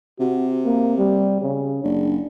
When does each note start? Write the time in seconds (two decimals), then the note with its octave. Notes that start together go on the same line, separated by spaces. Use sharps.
0.20 C3 F#4
0.66 A#3
0.98 G3
1.42 C#3
1.84 F#1 D4